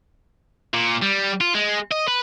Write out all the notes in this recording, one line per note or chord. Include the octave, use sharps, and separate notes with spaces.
A#2
G3
F4
G#3
D#5
B4